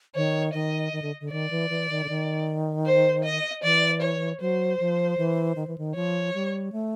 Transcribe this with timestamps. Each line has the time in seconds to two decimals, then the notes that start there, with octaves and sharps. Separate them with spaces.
0.15 D#3 C#5
0.54 D#3 D#5
0.93 D#3
1.02 D3
1.21 D3
1.31 D#3 D5
1.50 E3
1.70 E3
1.90 D#3
2.04 D3
2.09 D#3
2.86 C5
3.24 D#5
3.63 E3 D5
4.01 C#5
4.40 F#3 C5
4.80 F3
5.18 E3
5.56 D#3
5.67 E3
5.78 D#3
5.95 F3 C#5
6.34 G3
6.72 A3